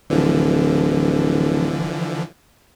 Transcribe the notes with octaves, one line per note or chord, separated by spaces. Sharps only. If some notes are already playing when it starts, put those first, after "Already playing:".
D1 D3 E3 F3